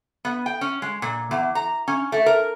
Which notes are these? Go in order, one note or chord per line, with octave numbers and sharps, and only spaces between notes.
B3
G5
C#4
G#3
A#2
E2
A#5
C#4
A3
A#4